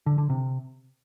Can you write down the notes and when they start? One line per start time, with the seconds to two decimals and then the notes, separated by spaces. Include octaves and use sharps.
0.06 D3
0.18 D3
0.30 C3